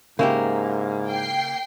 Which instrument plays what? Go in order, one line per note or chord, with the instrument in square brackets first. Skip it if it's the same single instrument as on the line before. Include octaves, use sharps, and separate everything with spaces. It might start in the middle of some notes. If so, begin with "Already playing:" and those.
[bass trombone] G#2 [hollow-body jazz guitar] C#3 E4 G4 [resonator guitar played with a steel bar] A#3
[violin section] G5 C7